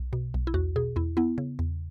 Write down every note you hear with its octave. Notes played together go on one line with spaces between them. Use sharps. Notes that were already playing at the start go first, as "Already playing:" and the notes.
Already playing: B1
B2
B1
E4
E2 F#4
B2 G#4
E2 E4
B3 E4
C#3
E2